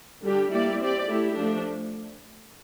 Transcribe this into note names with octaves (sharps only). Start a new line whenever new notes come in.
D3 G3 D4 G4
G3 A#3 E4 G4 D5
C4 G4 D5
A3 E4 G4
F3 A3 D4